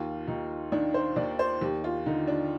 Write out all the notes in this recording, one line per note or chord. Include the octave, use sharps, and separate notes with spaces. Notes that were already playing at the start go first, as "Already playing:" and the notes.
Already playing: D#2 F4
D#2 D#4
D#3 D4
C5
D#2 D5
C5
D#2 G4
F4
D3 D#4
D4